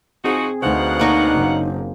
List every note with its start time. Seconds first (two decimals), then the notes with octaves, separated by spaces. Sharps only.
0.24 F3 C4 D#4 F#4 G#4
0.62 D2 B2 D#4 C5 F5 F#5
0.99 A#3 D4 D#4 C#5
1.32 F#1